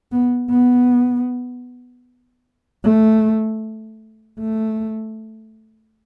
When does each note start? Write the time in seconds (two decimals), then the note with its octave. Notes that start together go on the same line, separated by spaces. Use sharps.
0.12 B3
0.50 B3
2.84 A3
4.39 A3